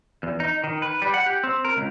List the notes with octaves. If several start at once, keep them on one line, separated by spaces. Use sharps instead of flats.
E2
D#4
D#3
B4
G3
F#5
G4
C4
A#4
C#2